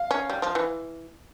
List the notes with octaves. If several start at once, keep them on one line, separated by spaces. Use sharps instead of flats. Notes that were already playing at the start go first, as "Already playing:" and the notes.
Already playing: F5
C#4
G3
F3
E3